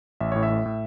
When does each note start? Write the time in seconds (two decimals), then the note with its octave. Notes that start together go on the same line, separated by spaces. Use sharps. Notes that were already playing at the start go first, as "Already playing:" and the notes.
0.20 A1 E5
0.32 A2 C#5
0.43 E5
0.50 A2
0.66 A2